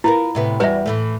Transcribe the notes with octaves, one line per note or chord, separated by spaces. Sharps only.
B3 E4 F4 A#4
A2 C3 B3
E2 G3 F#4 B4 E5
A2 E3 A3